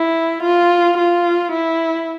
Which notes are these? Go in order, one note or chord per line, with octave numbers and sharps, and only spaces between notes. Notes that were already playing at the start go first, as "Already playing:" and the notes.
Already playing: E4
F4
F4
E4